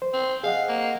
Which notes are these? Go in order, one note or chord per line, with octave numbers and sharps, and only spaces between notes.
C5
C4
G#4 D#5 F5 F#5
A#3